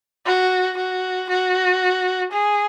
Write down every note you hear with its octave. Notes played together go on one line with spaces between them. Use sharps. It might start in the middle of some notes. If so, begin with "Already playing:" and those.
F#4
F#4
F#4
G#4